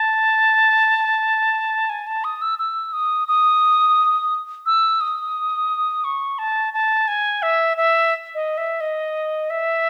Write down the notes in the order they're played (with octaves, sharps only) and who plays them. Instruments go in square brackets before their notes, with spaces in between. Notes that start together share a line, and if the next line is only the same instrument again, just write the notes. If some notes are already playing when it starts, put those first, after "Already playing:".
Already playing: [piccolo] A5
G#5
A5
D#6
E6
E6
D#6
D#6
E6
D#6
C#6
A5
A5
G#5
E5
E5
D#5
E5
D#5
E5